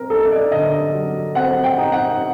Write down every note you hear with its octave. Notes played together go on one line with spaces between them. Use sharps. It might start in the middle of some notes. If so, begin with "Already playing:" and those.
Already playing: C4 A#4
D#4 A4
D#5
D5
D3 D#5
F#3
C4 F#5
G5
D#4
F#5